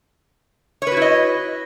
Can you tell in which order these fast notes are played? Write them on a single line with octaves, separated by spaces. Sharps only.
C#5 B4 F#4 E4 D#5